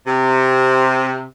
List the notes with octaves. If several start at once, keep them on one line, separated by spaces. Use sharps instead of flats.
C3